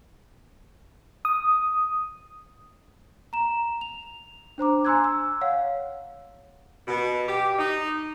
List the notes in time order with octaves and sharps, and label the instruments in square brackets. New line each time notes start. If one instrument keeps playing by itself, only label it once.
[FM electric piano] D#6
[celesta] A#5 E7
F7
D4 C5 A#5 D6
G#5 A#5 C6 E6 F#6 G#6
E6
C#5 F5 F#5
[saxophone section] B2
G4
D#4